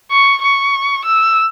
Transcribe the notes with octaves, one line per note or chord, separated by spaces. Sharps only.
C#6
C#6
E6